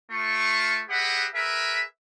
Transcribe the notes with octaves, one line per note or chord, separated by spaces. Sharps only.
A3 F4 C#6
G4 G#4 B4 D#5 E5 F#5
G#4 A#4 B4 E5